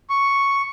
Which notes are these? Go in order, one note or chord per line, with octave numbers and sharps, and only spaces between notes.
C#6